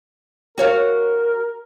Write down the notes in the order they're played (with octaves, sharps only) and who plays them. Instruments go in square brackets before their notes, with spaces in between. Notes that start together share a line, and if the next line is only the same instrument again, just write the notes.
[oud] F#4 C#5 F5 [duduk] A#4